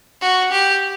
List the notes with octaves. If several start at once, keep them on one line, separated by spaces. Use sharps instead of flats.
F#4
G4